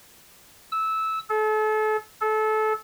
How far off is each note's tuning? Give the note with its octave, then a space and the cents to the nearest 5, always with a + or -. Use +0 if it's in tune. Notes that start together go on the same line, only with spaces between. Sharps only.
E6 -15
A4 -35
A4 -25